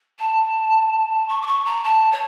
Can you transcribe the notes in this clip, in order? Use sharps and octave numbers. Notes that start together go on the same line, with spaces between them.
A5
C#6
D6
C#6
A#5
A5
C#5